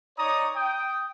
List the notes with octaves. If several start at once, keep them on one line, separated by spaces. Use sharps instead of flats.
D#4 C#5 D5 A#5 C#6 D#6
G5 D#6